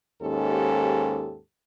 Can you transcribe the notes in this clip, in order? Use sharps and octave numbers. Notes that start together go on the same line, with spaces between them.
D#2 G#2 C#4 G4 A4